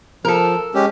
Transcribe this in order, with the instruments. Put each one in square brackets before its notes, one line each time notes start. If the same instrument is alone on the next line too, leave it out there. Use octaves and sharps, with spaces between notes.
[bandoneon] F3 [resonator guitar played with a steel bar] A4 A#4
[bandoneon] G#3 C#4 G4